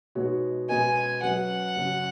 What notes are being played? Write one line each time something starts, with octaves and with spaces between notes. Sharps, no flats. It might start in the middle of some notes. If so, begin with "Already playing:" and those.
B2 G#3 D#4 F#4 C#5
B2 G#3 C#4 B4 D#5 G#5
F#3 C#4 B4 D#5 F#5
F#2 C#3 F#3 C#4